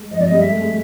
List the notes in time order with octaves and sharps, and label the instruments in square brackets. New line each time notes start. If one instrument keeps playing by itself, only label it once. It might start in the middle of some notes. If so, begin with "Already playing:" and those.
Already playing: [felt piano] G#3
[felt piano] F3 [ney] D#5
[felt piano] F#3 [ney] D5
[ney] D#5
[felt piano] G3
[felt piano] G#3 [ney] E5
[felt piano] A3
G#3